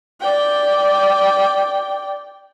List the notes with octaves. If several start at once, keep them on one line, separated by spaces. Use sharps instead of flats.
D5 G5